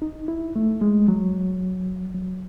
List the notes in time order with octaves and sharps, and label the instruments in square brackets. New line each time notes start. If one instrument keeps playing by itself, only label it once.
[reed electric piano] D#4
E4
A3
G#3
F#3
F#3